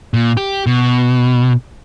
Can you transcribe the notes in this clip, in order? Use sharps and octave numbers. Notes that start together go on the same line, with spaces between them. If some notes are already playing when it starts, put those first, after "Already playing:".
A#2
G4
B2